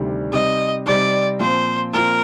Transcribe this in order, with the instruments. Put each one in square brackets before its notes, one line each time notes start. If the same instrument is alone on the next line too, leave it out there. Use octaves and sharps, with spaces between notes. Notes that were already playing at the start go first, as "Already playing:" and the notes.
Already playing: [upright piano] D2 C3 D#3 G3 D4
[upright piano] C3 G3 C4 D#4 [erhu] D#5
[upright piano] C3 G3 C4 D#4 [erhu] D5
[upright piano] A#2 F3 C4 F4 [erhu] C5
[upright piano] A#2 F3 C4 F4 [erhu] A#4